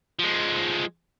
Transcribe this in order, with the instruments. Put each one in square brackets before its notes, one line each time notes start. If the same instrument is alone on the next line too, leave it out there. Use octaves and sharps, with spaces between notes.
[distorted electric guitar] F3 G#3